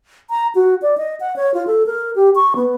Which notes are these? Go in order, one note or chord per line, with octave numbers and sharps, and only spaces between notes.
A#5
F#4
D5
D#5
F#5
C#5
F4
A4
A#4
G4
C#6
B3